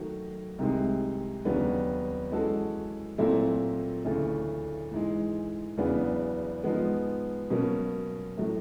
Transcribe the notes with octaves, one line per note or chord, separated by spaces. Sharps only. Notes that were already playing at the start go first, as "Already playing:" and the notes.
Already playing: D#3 F#3 A3
C2 C3 D#3 G#3
D#2 C#3 F#3 B3 D4
E3 G#3 C#4 F#4 A4
A#2 F#3 A3 C4 E4
D2 C#3 E3 A3
G#2 E3 G#3
E2 C#3 F#3 B3 D4
G#2 F3 G#3 B3
B2 F#3 A#3 C#4
A2 F#3 A3